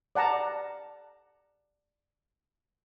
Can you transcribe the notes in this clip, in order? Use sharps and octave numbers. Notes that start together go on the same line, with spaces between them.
D5 F#5 A5 A#5